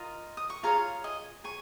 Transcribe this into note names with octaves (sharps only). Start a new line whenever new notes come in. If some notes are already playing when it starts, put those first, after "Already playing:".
Already playing: F4 A#4 D#5
D#6
C#6
F4 G#4 C#5 F5 A#5
D#5 G#5
G#4 G#5 C#6